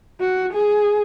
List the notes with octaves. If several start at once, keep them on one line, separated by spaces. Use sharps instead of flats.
F#4
G#4